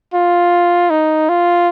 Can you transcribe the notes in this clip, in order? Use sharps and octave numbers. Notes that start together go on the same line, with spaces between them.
F4
D#4
F4